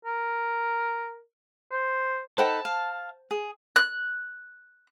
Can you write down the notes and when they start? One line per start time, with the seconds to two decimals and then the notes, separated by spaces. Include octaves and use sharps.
0.05 A#4
1.71 C5
2.38 D#4 A4 B4 C5 F#5 G5 A5
2.65 F5
3.31 G#4
3.76 F#6